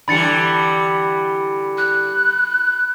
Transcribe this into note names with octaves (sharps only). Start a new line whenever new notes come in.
D3 E3 G3 B5 A6 C#7
F#6